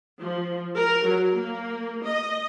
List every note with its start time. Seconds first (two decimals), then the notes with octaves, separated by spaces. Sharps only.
0.20 F3
0.76 A#4
1.06 F#3
1.36 A#3
2.04 D#5